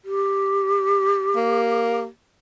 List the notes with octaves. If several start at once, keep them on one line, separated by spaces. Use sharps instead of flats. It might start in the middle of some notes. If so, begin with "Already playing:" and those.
G4
A#3